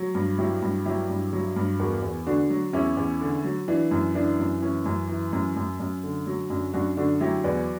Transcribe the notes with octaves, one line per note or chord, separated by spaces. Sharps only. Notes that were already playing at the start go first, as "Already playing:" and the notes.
Already playing: F#3
G2
F#3 E4 G4
G2
F#3 E4 G4
G2
F#3
G2
E2 F#4 A#4
E2
D3 D4 F#4
F#3
E2 C#4 E4
E2
D3
F#3
E3 D4
F#2
E3 D4
F#2
E3 C#4
F#2
E3
F#2
F#2
F#2
D3
F#3
F#2 D4
F#2 D4 F#4
D3 D4 F#4
F#3 E4 G4
E2 B4 D5